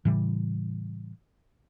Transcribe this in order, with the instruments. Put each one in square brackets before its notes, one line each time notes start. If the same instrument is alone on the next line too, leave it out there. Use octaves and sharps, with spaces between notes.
[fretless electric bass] A2 C#3 E3 G3